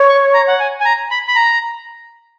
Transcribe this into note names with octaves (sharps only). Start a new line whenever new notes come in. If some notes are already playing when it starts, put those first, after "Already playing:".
Already playing: C#5
C#6
A#5
F#5
G#5
G#5
A#5
B5
B5
A#5